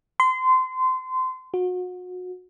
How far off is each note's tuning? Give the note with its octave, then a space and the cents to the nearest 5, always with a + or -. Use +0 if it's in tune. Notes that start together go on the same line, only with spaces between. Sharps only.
C6 -25
F#4 -30